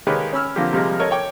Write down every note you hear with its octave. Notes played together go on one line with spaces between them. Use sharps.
D#3 G#3 A#3 G4 B4 C#5
C#4 B5 E6 F6
D3 F3 A#3 C4 F4 G4
C3 F3 G3 G#3 A#3
A4 A#4 C#5 D#5
C#5 G5 D6